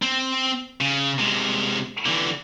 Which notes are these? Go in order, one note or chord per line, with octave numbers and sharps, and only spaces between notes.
C4
C#3
C3 G#3
D3 E3